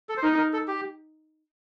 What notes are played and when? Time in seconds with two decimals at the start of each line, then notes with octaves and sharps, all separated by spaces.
0.09 A4
0.17 C5
0.23 D#4 A#4
0.38 A#4
0.53 A4
0.68 G4